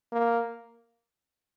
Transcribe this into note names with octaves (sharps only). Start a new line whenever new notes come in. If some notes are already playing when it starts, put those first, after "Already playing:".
A#3